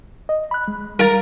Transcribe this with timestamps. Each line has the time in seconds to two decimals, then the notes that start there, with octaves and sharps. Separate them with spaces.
0.29 D#5
0.51 B5 F#6
0.68 G#3
0.99 G3 A#4 F5 A6